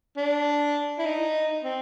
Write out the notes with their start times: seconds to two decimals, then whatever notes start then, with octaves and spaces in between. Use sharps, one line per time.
0.17 D4
0.99 E4
1.05 D#4
1.64 C4